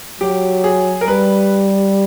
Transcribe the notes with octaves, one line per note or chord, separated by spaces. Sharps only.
F#3 G4
G#4
A#4
G3 B4